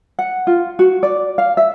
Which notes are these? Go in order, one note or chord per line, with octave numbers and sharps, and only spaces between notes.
F#5
F4
F#4
D5
F5
E5